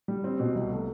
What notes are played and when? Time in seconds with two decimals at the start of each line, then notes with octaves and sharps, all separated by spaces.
0.08 G3
0.24 C4
0.40 B2
0.55 C2
0.71 A3